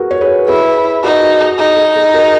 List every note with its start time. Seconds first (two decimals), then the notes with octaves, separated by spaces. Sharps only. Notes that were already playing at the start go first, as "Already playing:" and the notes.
Already playing: F#4 G#4 A#4 B4
0.11 C#5
0.21 G#4 B4
0.48 E4 G#4 B4
1.04 D#4 F#4 A#4
1.22 F#4
1.41 G#4
1.59 D#4 G#4
1.77 G#4
1.96 G#4
2.14 F#4 A#4